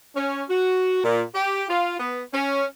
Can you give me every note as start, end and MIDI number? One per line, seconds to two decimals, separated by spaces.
0.16 0.43 61
0.50 1.02 66
1.04 1.22 46
1.34 1.64 67
1.69 1.96 65
2.00 2.22 59
2.33 2.64 61